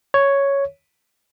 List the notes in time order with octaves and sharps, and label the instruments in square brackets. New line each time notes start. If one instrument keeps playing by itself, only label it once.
[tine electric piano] C#5